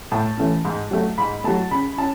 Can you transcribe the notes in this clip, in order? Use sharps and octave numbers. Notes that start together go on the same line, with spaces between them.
A2 A5
E3 A3 C#4
G#2
F#3 A3
G#2 B5
F#3 A3 A5
C#3 B5
C#4 A5